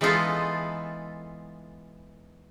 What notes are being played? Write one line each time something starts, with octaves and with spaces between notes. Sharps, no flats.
E3 G#3 B3 D#4 F4 A4